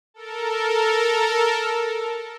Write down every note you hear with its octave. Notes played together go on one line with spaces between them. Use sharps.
A4 A#4